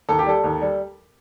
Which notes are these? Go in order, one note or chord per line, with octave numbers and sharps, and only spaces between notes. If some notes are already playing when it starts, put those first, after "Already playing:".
D#2 A4
G4
G3 A4
D#2
G3